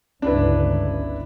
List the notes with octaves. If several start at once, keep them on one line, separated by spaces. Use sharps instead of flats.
G1 C#2 D4 E4 B4